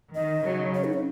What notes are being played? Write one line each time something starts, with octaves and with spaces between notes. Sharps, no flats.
D#3 D#5
C#3 F#3
C#5
D#4
C#4